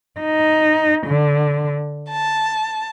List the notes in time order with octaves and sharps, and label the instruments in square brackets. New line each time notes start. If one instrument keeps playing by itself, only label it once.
[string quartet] D#4
D3
A5